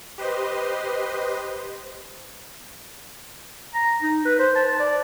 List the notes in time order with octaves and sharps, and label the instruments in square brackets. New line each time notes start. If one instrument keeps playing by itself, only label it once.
[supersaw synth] G4 B4 C5 D#5 C6
[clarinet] A#5
D#4
B4
C5
A5
D5